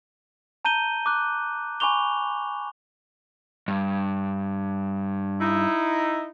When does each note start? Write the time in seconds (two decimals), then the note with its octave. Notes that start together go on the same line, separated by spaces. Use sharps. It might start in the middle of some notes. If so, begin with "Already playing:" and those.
0.65 A5 A#5 G6 D#7 G7
1.06 D6 F#6
1.80 G#5 B5 C#6 D6 F7 G7
3.68 G2
5.41 D#4 E4